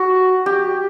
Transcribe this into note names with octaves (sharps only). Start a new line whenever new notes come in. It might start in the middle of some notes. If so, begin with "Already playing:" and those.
Already playing: F#4
G4